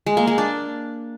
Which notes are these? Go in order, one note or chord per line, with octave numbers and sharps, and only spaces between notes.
G#3
A#3
G#3
D4